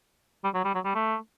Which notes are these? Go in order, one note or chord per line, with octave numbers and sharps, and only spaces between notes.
G3
F#3
G3
F#3
G3
A3